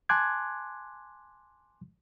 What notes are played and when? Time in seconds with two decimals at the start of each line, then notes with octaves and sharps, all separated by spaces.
0.09 G#5 A5 C6 D6 F#6 G#6